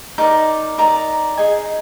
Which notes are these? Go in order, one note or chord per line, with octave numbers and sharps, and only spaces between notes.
D#4 A#4 D5 D6
D#4 A#4 D5 A#5
D#4 G#4 D#5 G#5